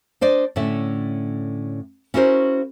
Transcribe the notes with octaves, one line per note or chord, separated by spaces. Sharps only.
D4 C5 D5 D#5
A2 D3 C#4 E5
C#4 E4 F#4 A#4 C5